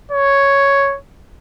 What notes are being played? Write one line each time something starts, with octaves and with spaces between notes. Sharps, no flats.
C#5